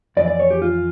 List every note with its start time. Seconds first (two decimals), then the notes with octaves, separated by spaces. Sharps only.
0.17 F2 D5
0.20 E3
0.28 D5
0.39 C#5
0.50 G4
0.62 F4